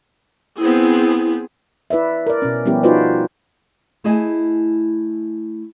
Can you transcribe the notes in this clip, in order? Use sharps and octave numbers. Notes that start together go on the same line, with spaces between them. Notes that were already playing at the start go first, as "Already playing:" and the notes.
B3 C4 E4 G#4
E4 B4 D5 E5
A#4 D5
B2 C#4
F3 G3 B3 C#4 E4 G4
D#4 F4 F#4 B4 C5 D5
A3 E4 G#4 D#5 G#5